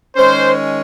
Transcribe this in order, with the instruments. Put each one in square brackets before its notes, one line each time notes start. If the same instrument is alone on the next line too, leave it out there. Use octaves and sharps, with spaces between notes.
[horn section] D#3 G#3 C#4 C5